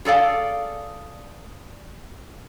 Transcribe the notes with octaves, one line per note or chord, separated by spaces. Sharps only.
G#4 A4 D5 F5